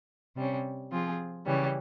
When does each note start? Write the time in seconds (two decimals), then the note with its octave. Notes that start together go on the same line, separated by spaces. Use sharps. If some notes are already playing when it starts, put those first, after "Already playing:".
0.36 C3 G3 C#4
0.91 F3 C4 F4 G#4
1.46 C#3 E3 G3 C#4